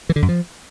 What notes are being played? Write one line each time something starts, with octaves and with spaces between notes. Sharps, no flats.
E3
D3
F#2
F3